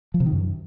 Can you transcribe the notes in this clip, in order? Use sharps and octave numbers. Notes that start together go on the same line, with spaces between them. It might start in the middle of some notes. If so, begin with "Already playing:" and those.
F3
C3
D#3
F#2